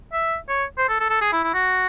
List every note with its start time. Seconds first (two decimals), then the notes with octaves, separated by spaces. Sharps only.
0.13 E5
0.49 C#5
0.78 C5
0.89 A4
1.00 A4
1.10 A4
1.22 G#4
1.33 E4
1.44 E4
1.54 F#4